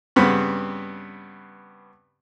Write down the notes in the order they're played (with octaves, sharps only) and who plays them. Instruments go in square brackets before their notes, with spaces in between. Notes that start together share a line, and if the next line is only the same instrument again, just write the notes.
[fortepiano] G2 C#3 B3 C4 B5